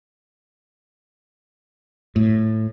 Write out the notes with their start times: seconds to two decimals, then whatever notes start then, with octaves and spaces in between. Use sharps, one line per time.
2.16 A2